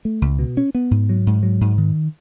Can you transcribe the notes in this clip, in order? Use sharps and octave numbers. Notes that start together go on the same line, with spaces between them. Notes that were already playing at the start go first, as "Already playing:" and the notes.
A3
C#2
B2
C#4
B3
G#2
F#3
G#2
F#3
G#2
D#3